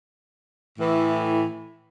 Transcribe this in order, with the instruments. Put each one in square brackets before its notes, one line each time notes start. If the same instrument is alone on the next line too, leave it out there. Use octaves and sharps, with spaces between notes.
[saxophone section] A2 E3